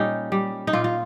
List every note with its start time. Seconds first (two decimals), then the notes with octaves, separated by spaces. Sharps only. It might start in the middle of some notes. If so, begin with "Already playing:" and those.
Already playing: A#2 G3 C#4 D#4
0.32 G3
0.67 D#4
0.73 A#2 F4
0.84 F4